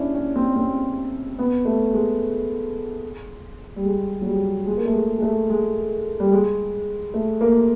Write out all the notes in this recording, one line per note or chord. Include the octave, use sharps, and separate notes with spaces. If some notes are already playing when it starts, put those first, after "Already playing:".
Already playing: C#4 D4 E4
C#4
C4
C#4
C4
B3
A3
G#3
G3
G#3
F#3
G3
G#3
A#3
A3
G#3
G#3
A3
G#3
G3
G#3
A3
A#3